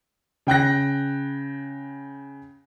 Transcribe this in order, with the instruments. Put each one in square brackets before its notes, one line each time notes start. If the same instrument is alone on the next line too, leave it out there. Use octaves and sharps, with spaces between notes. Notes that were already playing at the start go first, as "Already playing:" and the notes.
[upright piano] C#3 G5 F#6 A#6